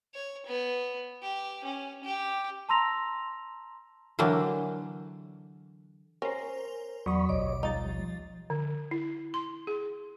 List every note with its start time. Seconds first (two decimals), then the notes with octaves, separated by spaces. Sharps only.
0.15 C#5
0.46 B3
1.22 G4
1.64 C#4
2.04 G4
2.69 A5 A#5 C6 E6 A#6 F7
4.19 D3 E3 F#3 G3 A#3
6.22 C#4 A#4 C5
7.06 E2 F#3 D5 B5 C#6 D#6
7.29 A1 D2 B2 C#5 D#5 D6
7.63 F3 G3 D#4 A6
8.50 D3
8.91 E4
9.34 C6
9.67 G#4